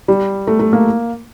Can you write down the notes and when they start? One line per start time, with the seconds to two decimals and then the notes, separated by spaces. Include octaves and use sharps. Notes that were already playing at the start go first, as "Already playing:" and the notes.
0.08 G3
0.47 A3
0.59 A3
0.73 A#3